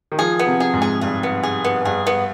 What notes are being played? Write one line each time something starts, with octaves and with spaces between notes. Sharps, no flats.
D#3
F3 G#4
B3
C3
G#4
G#2
G#4
G2 G#4
B3
G#4
B3
G2 G#4
B3